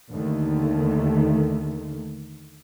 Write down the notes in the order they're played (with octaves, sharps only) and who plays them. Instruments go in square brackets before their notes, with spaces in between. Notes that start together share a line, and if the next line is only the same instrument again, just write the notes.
[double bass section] D#2 D3 D#3 A3